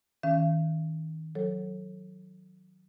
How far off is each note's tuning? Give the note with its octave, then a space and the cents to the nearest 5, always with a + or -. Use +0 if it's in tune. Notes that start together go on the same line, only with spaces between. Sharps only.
D#3 +30 C#4 +0 F5 -40
F#3 +0 A4 +0 C#5 -30